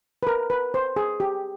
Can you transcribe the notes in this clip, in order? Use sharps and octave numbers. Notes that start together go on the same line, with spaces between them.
B4
A#4
B4
C5
G#4
G4